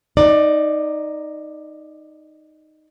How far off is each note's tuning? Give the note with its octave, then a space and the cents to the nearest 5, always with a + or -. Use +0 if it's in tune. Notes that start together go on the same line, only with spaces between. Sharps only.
D#4 +0 D5 +15